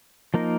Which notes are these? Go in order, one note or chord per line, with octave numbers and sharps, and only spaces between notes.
F3 A#3 D#4 A#4